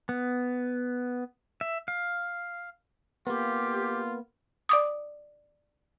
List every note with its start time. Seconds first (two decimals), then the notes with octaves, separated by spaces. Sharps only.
0.09 B3
1.61 E5
1.88 F5
3.27 A#3 B3 F4 G4
4.69 D5 D6 D#6